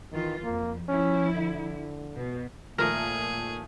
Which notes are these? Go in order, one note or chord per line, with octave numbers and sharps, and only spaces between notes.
D#3 E3 F4
F2 A#3
F3 C#4 E4
D3
B2
A#2 D#3 F3 A3 G#4 A#4